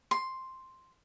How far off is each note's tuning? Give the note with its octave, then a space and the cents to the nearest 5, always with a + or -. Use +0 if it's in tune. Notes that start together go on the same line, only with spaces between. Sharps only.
C6 +5